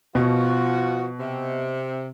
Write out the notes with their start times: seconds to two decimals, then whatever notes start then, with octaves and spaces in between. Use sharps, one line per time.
0.15 B2 F3 F4 F#4
1.20 C3